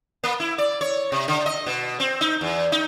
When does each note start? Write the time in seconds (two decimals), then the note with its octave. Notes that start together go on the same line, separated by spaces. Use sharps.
0.24 A#3
0.40 E4
0.58 D5
0.81 C#5
1.12 C3
1.28 D3
1.46 D#5
1.66 B2
2.00 C4
2.21 D#4
2.41 E2
2.72 D#4